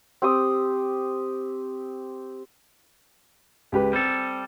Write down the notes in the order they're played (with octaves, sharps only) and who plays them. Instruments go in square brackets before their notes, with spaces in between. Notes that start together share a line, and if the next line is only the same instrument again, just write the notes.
[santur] C4 G4 D#6
[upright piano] C#2 G4 B4
[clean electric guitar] G3 A4 [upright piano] C4